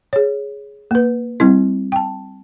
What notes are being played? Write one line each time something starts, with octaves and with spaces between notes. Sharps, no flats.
G#4 C#5
A#3 B4
G3 C4 E4
G5 A5